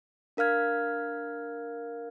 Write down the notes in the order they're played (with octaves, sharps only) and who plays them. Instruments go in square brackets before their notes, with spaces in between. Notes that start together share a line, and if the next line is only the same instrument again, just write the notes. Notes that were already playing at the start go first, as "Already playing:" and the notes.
[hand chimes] D4 A#4 F5 F6 G#6